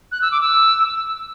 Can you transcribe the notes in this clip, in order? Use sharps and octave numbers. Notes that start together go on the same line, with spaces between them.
F#6
E6
D6
E6